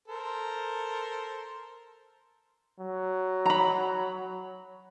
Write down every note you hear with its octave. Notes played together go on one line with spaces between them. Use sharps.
A4 A#4 C5
F#3
A#5 B5